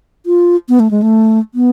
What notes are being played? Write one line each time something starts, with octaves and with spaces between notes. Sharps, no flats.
F4
B3
A3
G#3
A3
B3